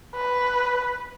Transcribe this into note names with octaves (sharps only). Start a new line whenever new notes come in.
B4